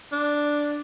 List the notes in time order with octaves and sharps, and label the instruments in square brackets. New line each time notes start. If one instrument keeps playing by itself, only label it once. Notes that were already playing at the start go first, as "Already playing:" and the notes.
[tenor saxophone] D4